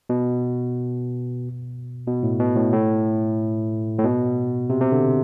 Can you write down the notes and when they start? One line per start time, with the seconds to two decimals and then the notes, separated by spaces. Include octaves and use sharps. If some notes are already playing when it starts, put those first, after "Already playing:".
0.09 B2
2.07 B2
2.23 A2
2.39 B2
2.56 A2
2.73 A2
3.99 A2
4.04 B2
4.70 C3
4.81 C3
4.92 D3